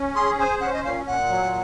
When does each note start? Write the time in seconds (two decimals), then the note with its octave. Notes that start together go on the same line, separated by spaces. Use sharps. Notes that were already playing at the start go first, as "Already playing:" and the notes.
Already playing: C#4
0.15 G#4 C6
0.39 C5 G#5
0.60 C#4 F#5
0.73 D#5
0.84 A#2 F5
1.06 A#2 F#5
1.29 F#3